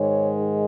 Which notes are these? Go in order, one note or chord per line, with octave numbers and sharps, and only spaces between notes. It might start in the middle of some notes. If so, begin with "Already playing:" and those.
Already playing: G#2 D#3 G#3 C#5